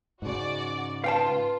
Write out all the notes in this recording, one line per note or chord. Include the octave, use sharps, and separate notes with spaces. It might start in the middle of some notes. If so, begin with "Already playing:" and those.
G#2 C#3 F#4 D5
F4 B4 F5 G5 A5